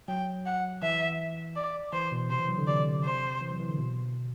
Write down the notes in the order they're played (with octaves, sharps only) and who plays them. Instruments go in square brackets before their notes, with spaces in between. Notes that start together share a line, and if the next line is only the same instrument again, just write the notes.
[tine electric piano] F#3 [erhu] G5
[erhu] F#5
[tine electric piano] E3 [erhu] E5
[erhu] D5
[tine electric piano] E3 [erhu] C5
[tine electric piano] B2
[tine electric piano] C3 [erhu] C5
[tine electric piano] E3
F#3
D3
[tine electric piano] C3 [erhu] D5
[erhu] C5
[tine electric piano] E3
F#3
E3
D3
B2